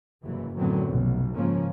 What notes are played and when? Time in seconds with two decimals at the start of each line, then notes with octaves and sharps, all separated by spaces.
0.24 F#1 G2 C3 E3
0.56 F#2 A2 D3 F#3 B3 C4
0.87 F1 B1 B2
1.35 G#1 G#2 C#3 F3 A#3 C#4